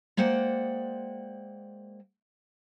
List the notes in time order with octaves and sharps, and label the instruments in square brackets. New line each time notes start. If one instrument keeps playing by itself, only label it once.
[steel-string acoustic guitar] G#3 A#3 C5 D5 F#5 G5